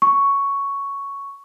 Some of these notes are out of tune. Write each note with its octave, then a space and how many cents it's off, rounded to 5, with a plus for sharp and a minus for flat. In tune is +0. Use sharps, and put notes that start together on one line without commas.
C#6 +5